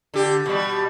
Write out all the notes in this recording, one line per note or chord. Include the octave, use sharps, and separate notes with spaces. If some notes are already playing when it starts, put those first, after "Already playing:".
D3 G4
B2 G3